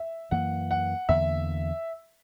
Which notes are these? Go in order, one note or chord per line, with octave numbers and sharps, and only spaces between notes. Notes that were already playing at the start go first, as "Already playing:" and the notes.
Already playing: E5
F#2 E3 A#3 F#5
F#5
E2 D3 A#3 E5